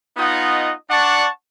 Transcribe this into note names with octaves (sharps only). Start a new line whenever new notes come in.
B3 D#4 F4 D#5 F#5
D4 D5 F#5 A5 C#6